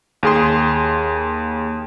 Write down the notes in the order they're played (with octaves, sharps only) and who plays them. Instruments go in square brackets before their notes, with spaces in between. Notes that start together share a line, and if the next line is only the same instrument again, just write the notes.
[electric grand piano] D#2 G#4 C6